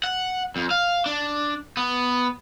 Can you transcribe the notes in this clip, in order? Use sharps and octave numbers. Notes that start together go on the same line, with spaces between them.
F#5
F2
F5
D4
B3